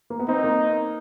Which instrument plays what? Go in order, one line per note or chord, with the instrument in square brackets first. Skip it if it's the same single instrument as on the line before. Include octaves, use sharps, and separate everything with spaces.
[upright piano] A#3
B3
[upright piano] C4 [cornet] D#4
[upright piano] A#3